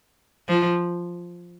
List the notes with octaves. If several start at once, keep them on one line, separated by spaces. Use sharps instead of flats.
F3